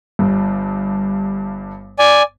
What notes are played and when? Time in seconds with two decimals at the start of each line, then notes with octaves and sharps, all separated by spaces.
0.19 G1 G2
1.99 D5 G#5